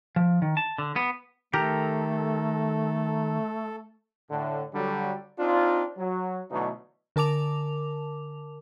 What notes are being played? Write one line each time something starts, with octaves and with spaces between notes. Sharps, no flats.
F3
D#3
A5
D3
B3
D#3 A3 G4 A4 A#4 A#5
A2 D3
D3 F#3 G3
C4 D4 D#4 F4
F#3
B2 D3 E3 F#3 A3 D#4
D3 A#4 A5 D6 F7